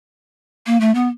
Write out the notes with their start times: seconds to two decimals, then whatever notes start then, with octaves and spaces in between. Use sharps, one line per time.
0.66 A#3
0.80 A3
0.95 B3